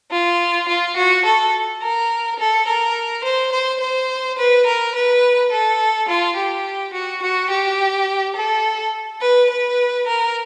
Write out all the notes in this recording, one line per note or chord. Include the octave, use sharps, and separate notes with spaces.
F4
F4
F#4
A4
A#4
A4
A#4
C5
C5
C5
B4
A#4
B4
A4
F4
G4
F#4
F#4
G4
A4
B4
B4
A#4